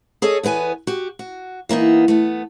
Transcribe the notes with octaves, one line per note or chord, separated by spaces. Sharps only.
G#4 A4 C#5 D#5
E2 B3 B4 G#5
F#4 G4
F#4
E3 A#3 B3 D#4
A3 B3